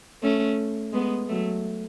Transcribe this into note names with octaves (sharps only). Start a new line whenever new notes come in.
A3 C#4
G#3 B3
F#3 A3